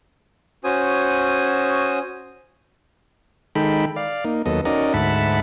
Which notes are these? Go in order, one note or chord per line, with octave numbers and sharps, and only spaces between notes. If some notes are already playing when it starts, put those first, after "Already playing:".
C#4 F#4 C5 G#5 D#6
D#3 G#3 D#4 A4 G5 B5
D5 F5
A#3 D#4
D#2 F#3 B3 A4 D#5
C#4 D#4 F#4 A#4 D5 D#5
D2 G#2 E5 F#5 A5 B5